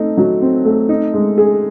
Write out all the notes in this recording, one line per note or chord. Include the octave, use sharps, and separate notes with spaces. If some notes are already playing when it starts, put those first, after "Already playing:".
Already playing: A3 C4 D#4
F#3
C4
A3
D#4
G#3
G#4